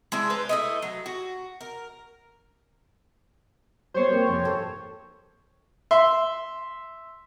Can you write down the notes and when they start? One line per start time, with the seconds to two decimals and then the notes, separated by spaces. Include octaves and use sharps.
0.12 G#3 D4 E4
0.30 B4 C5 A#5
0.49 A3 E4 D#5
0.82 F#3
1.06 F#4
1.61 A#4
3.94 G3 B3 C5 C#5
4.10 A#3 C4
4.27 F2 G#2 C3
4.46 G#2 A4
5.91 E5 C6